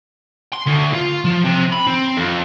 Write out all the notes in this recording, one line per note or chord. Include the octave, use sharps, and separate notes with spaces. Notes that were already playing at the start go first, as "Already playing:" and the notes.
C6
D2
F4
F3
C3
B5
C4
F2